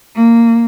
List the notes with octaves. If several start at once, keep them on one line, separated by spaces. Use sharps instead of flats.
A#3